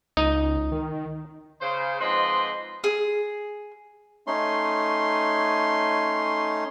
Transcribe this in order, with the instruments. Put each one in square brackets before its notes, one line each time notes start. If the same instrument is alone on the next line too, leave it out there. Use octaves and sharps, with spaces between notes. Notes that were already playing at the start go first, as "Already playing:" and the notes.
[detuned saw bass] C#2 [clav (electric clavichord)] D#4
[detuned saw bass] D#3
[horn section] C#3 C5
G#2 F3 C4 B4 D#5 C6
[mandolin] G#4
[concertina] A3 C#4 D#4 C6